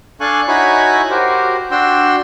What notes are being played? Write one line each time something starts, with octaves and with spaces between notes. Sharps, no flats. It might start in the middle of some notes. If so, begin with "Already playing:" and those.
D4 A4 F5 G#5 C#6 F#6
D#4 E4 F#4 C#5 G#5 B5
F#4 G4 A#4 C5
D4 F#4 G5 C6 E6